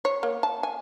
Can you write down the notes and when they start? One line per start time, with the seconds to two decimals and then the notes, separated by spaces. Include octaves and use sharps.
0.05 C#5
0.23 A#3
0.43 A5
0.63 G#5